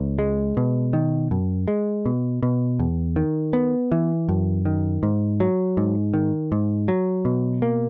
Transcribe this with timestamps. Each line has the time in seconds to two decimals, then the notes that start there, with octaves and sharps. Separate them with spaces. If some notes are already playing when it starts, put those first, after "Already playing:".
Already playing: C#2
0.19 G#3
0.57 B2
0.93 D#3
1.31 F#2
1.68 G#3
2.06 B2
2.43 B2
2.79 E2
3.16 D#3
3.53 B3
3.92 E3
4.29 F#2
4.65 D#3
5.03 G#2
5.40 F#3
5.77 G#2
6.14 D#3
6.52 G#2
6.88 F#3
7.25 B2
7.62 A#3